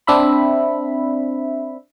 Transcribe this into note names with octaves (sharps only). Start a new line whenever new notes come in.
C4 D4 E5 B5